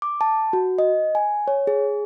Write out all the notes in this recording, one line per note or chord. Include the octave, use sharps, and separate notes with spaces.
D6
A5
F#4
D#5
G#5
C#5
G#4